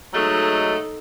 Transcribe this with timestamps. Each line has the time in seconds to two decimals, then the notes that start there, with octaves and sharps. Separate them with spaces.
0.14 F#3 G#3 A3 D#4 A4